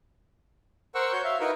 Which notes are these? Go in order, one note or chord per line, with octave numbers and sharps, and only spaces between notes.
A#4 C5 F#5 C#6 E6
F#4 C#5 G6
E5 F5
D#4 E4 F#4 A#4 B4